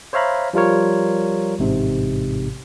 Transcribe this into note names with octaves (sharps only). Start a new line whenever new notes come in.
C5 C#5 E5 F5 A#5 B5
F3 G3 F4 A#4 C#5
A1 G#2 C3